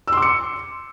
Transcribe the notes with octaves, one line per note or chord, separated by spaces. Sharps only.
C6 D6 E6 C#7